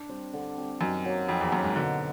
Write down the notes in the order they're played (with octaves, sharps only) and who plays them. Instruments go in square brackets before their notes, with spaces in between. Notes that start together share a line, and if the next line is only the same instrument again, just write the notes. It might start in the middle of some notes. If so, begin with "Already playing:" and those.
Already playing: [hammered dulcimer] D4
G3 C4
D3
G3 C4
[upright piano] F#2 [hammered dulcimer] D#3
[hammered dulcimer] F#3 A#3
[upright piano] F2 [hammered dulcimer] D#3
[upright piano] E2
[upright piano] F#2 [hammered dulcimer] F#3 A#3
[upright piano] G#2
[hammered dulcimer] B2 [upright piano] D3